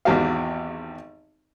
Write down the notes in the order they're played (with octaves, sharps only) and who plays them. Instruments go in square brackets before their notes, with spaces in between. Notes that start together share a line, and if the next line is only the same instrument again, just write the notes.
[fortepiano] G#1 E2 F#4 G4 F5